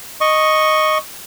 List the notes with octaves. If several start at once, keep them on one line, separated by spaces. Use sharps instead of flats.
D#5 C#6